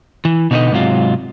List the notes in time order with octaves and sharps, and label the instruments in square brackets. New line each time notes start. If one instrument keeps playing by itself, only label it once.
[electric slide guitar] E3
B2 D3 A3 D#4 B4 D#5
G#2 C3 F#3 F4